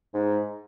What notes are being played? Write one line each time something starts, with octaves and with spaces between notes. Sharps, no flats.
G#2